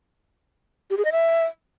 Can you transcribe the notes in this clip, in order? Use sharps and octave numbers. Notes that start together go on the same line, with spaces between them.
G4
G#4
D#5
E5